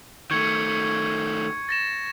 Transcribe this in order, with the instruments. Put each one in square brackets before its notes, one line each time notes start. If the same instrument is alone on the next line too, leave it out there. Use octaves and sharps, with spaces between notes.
[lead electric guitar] D#3 A3 [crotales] C#6 G#6 C#7
[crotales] A6 A#6 E7